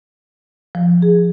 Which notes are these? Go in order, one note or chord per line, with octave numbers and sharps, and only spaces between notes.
F3
G#4